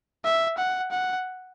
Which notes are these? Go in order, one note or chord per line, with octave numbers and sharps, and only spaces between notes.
E5
F#5
F#5